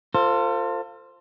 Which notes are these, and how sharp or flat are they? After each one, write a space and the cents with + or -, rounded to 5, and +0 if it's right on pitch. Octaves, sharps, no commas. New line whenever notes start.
F4 +0 A4 +40 C5 +5